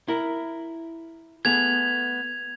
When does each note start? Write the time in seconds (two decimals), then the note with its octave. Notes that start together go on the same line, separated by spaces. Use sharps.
0.08 E4 A#4
1.45 A3 B3 G#4 G#6 F7